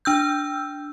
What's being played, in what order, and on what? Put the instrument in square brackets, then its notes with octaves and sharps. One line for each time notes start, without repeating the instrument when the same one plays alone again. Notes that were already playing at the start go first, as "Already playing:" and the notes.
[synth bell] D4 E6 G6